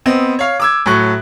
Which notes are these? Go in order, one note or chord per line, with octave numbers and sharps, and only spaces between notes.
B3 C4 D#5
C#5 F5
D6 E6 G#6
A2 F#3 C#6 F#6